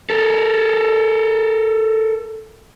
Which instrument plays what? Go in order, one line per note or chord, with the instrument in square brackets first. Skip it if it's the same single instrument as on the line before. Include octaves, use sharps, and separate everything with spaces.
[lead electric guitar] A4 A#4